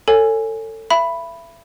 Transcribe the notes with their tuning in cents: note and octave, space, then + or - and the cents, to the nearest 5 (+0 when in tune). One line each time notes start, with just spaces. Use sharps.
A4 +25 C#5 +0 G#5 +0
E5 +30 B5 +0